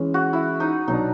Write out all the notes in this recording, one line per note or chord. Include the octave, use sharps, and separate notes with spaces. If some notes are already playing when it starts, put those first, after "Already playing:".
Already playing: E3 G#3 C#4
F#4
E4
D#4
B2 F#3 B3 D4 D#4